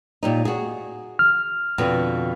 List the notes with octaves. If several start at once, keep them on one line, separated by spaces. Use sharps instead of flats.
A#2 G3 D#4
F#4 G#4
F6
F2 B2 D3